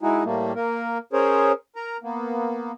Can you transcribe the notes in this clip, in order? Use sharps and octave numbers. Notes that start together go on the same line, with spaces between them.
G#3 D#4 E4 F#4 G#4
A2 G3 A3 A#3
A#3 A#4
C#4 G#4 A#4 C5 C#5
A#4 A#5
A#3 B3